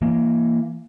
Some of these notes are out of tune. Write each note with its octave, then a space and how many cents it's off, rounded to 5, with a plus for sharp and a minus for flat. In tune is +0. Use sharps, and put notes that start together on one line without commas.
E3 +30 A#3 +0